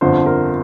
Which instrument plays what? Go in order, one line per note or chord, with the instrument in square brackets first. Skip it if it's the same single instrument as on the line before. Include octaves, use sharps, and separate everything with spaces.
[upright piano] G1 F2 D3 F3 C5
A#4